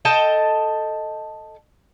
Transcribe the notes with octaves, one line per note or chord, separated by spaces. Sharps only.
A4 D#5 G5 A5